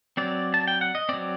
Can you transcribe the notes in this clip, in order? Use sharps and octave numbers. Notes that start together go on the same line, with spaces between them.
F#3 C4 D5
A5
G5
F#5
D#5
F#3 C4 D5